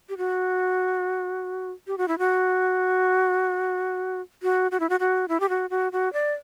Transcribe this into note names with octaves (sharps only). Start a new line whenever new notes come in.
G4
F#4
G4
F#4
E4
F#4
F#4
F#4
E4
F#4
F#4
E4
G4
F#4
F#4
F#4
D5